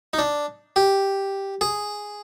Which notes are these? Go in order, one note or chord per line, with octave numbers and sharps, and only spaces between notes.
D#4
D4
G4
G#4